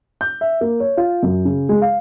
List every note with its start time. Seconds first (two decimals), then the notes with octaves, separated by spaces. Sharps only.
0.21 G6
0.41 E5
0.61 A#3
0.80 C#5
0.97 F4
1.23 F#2
1.45 C#3
1.69 G#3
1.82 F5